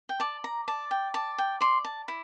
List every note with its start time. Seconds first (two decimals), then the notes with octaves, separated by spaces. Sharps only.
0.09 G5
0.20 D5 A5
0.44 A#5
0.68 D5 A5
0.91 G5
1.14 D5 A5
1.38 G5
1.61 D5 C6
1.85 A5
2.08 E4